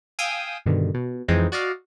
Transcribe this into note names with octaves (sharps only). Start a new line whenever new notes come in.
F5 G5 G#5 D#6 E6 G6
G2 B2 D3 D#3
B2
F2 E3 G#3 C4 D#4
F#4 D5 D#5 F5